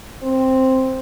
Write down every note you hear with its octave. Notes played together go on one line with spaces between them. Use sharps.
C4